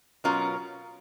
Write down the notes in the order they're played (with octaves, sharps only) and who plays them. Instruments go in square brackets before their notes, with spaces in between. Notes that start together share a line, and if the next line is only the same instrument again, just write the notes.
[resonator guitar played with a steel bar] B2 F#3 C#4 F4 A#4